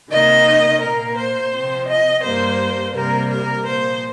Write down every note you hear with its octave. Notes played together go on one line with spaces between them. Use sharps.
C3 D#3 A#3 D#5
A#2 A#3 A#4
C5
C3 F3 C4
D#5
G2 G3 A#3 C5
C3 G3 A#3 A#4
A#4
A#2 F3 A#3 C5